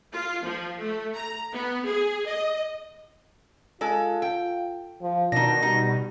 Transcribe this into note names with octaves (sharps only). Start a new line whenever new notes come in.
F4
F3
A3
A#5
B3
G#4
D#5
G#3 F4 A4
G5
F3
B2 D#3 D4 D#4 A#6
G3 D#4